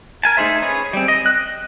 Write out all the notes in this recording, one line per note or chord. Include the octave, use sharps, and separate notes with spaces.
A#4 G#5 A5
A3 D#4 G#4 C5 E5
C#4 G#4 B4
G3 C4
D#5
F#6